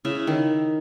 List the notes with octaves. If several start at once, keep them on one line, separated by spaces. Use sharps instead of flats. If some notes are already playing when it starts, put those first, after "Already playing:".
C#3 E4 E5
D#3